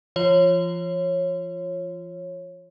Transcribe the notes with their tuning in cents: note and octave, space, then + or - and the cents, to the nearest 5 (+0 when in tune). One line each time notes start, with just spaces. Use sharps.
F3 -40 F4 +0 C#5 -20